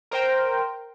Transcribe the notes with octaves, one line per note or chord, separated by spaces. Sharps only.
A#4 C5 G5